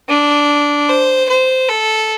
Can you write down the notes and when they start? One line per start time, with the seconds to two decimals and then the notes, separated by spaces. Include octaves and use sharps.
0.09 D4
0.89 C5
1.29 C5
1.69 A4